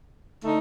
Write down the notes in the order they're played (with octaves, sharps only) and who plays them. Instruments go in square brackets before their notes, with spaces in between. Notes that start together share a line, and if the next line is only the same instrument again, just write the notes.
[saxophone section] D3 A3 D#4